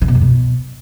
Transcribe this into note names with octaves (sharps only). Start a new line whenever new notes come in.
D3
B2
F2
B2